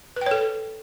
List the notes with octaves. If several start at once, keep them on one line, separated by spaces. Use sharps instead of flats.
A4 B4 C#5 G5